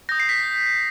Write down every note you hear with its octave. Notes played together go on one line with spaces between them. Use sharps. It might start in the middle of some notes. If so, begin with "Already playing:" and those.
D#6 G6 A#6
C7
B6